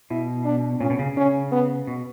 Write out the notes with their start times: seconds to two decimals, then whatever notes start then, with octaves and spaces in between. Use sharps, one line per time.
0.10 B2 E4
0.45 D4
0.80 A#2 C#4
0.90 B2
0.99 C#3
1.16 C#3 C#4
1.52 B3
1.87 B2